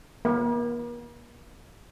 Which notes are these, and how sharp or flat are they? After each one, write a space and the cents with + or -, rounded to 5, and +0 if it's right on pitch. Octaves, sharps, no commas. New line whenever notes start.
A#3 +40